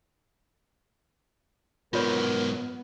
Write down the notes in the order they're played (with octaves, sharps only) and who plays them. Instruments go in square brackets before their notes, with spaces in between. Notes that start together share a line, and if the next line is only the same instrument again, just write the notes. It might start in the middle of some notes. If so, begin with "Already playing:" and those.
[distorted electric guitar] G#2 F#3 [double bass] B3 [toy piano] F4 C#5 [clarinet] A#4